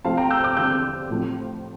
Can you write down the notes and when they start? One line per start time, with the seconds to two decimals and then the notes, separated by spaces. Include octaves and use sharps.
0.04 C3 F3 A3 C4 F5 A5
0.17 G5 A#5
0.30 E6 G6
0.44 D6 F6
0.57 E2 D3 G3 C4 E6 G6
1.10 A2 F3 C4